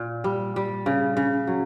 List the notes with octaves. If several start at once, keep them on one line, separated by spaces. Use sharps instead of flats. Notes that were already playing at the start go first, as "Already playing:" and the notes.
Already playing: A#2
G3
G3
C#3
C#3
F#3